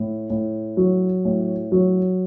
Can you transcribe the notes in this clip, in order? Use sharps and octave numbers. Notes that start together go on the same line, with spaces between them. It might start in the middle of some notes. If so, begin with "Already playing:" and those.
Already playing: A2
A2
F#3
A2
F#3